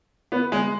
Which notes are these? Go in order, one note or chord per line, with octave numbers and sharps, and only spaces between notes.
B3
G#3